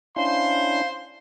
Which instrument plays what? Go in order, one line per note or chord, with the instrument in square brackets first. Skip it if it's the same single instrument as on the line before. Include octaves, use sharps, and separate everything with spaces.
[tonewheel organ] C#4 D4 E4 [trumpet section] C5 C6 [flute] F5